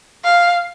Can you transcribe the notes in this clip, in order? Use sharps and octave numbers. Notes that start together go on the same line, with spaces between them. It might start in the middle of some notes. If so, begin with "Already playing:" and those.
F5